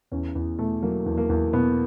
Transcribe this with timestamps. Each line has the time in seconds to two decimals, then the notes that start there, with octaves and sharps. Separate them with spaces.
0.12 E2 C#4
0.35 E2 B3
0.59 B2 A3
0.82 F#3 A#3
1.06 E2
1.17 A#3
1.30 E2
1.53 B2 B3